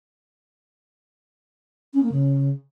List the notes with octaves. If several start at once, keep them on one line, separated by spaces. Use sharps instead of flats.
C#4
A#3
C#3